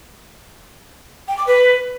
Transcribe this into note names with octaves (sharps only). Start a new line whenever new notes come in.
G5
D6
B4